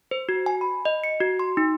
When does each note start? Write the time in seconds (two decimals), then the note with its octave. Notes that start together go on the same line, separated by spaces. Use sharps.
0.11 C5
0.29 F#4
0.46 G#5
0.61 B5
0.85 D#5
1.04 C#7
1.21 F#4
1.39 C6
1.57 D#4